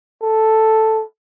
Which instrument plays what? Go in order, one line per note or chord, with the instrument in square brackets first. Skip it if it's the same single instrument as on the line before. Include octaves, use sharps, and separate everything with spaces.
[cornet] A4